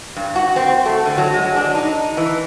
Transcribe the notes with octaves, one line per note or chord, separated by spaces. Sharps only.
G2
F#4
C4
A3
D3
F#3
G#3
D4
D#4
E3